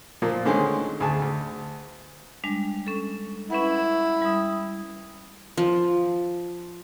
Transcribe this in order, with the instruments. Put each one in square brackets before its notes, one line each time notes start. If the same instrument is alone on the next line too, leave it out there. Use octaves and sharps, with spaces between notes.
[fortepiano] A#2 F3 A#3
D3 D#3 G#3 C4 C#4
D2 G#4 A5
D2
[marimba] G3 G#3 D4
C#4 A4
[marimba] C#4 B4 F#5 [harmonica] E4
[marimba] G3 D#6
[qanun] F3